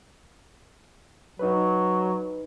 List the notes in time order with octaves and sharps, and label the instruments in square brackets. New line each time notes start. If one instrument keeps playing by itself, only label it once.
[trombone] F#3 [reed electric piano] D#4 B4